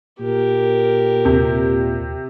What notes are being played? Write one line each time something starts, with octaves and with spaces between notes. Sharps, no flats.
A#2 G4 A#4
D#2 C3